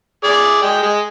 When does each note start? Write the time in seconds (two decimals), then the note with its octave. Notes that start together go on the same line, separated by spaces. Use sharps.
0.24 G#4 D5
0.62 G#3 G5
0.83 G#3